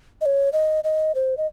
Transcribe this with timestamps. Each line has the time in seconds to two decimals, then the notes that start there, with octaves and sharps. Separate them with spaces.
0.21 D#5
0.26 C#5
0.53 D#5
0.84 D#5
1.15 C5
1.37 D#5